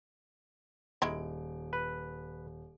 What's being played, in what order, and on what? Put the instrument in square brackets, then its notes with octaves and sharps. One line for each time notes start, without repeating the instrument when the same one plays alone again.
[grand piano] D#1 D7 [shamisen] D#3 G#3 E4
[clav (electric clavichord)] B4